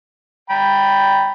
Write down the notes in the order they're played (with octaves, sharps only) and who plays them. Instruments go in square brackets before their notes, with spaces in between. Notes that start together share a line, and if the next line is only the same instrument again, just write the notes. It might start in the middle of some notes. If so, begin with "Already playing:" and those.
[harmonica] G5 A#5 B5